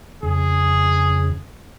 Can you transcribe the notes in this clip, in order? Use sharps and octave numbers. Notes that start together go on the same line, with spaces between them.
F2 C#3 G#4